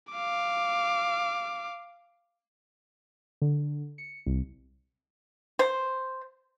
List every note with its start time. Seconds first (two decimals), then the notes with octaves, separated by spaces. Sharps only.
0.13 F5 D6
3.42 D3
3.98 C#7
4.26 C2
5.59 C5